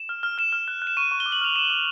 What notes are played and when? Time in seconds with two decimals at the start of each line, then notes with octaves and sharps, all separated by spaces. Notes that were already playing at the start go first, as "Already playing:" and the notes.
Already playing: E7
0.09 F6
0.23 F6
0.38 F6 E7
0.52 F6
0.68 F#6
0.82 F#6
0.87 E7
0.97 C#6 D#7
1.11 C#6
1.20 G7
1.26 D6
1.32 F#7
1.41 F6 F7
1.56 D6 E7
1.70 D6